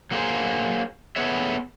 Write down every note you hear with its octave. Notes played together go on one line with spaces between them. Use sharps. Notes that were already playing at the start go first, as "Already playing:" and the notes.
F#3 A#3 C4 F#4 G#4 C5
A3 B3 G#4 B4 C#5 E5